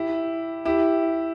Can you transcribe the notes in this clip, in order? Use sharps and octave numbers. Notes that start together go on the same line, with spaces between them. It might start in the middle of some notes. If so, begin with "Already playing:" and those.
Already playing: E4 G4
E4 G4